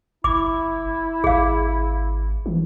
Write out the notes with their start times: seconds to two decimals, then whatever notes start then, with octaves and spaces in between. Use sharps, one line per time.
0.24 F#1 E4 D6
1.24 G#1 G#4 F5
2.46 E3